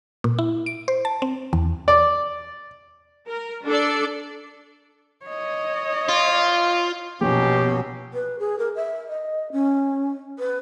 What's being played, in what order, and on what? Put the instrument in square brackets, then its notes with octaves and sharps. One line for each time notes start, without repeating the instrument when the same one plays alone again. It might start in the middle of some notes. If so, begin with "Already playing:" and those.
[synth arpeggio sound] A#2
E4
D7
C5
A5
C4
E2
[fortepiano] D5
[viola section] A#4
D4 A4 D5
[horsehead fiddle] C#5 D#5
[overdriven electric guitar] F4
[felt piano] A#1 [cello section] B2 [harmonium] F#3 C#4 [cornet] G4
[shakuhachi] B4
G#4
A#4
E5
D#5
C#4
B4